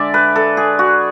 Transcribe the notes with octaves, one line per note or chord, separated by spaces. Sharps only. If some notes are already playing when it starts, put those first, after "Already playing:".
Already playing: D3 G#3 D5 E5
B4
A4
G#4
F#4